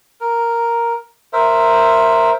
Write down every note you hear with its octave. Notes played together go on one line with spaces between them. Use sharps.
A#4
A#4 C5 E5